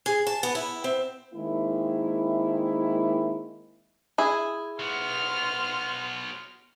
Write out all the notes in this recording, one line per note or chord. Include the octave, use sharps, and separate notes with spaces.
G#4
A5
B3
E4
C4
D#3 G#3 A#3 C4 E4
E4 G#4
F#3 B3 C6 F6